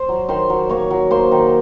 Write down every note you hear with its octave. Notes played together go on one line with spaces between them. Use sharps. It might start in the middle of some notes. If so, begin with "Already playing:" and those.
Already playing: C5 C6
F#3
D#3 C5 C6
F#3
A#3 C#5 C#6
F#3
A#3 C5 C6
D#3